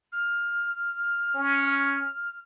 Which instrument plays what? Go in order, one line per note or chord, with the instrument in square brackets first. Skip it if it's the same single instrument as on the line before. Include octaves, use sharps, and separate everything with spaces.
[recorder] F6
[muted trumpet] C#4